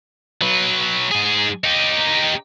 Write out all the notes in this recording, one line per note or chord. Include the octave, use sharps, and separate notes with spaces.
F#3 B4
G#2 G#4
D#4 G4